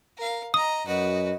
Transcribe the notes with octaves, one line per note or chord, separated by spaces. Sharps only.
A#4 F5
D#5 A#5 D#6
F#2 F#4 B4 D#5